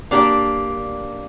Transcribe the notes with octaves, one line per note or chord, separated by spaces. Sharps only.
A#3 D4 G4